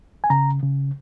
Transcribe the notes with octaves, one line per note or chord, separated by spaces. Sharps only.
G#5
C#3 A#5
C#3